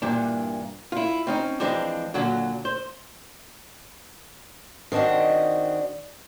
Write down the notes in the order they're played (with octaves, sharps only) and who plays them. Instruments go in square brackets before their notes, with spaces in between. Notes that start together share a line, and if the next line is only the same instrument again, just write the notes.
[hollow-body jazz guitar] G2 A#2 E3 D4
E4 F4
C4 C#4 D#4
E3 F3 G#3 C4 D4
A#2 D3 F#3 F#4
C5
[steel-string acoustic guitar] D#3 C4 D4 F#4 D#5